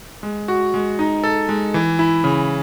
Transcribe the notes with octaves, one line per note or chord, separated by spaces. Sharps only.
G#3
F#4
G#3
D#4
A4
G#3
E3
E4
C#3